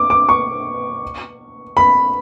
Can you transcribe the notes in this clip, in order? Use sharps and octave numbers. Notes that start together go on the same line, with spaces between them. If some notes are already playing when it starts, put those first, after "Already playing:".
Already playing: D6
D6
C#6
B5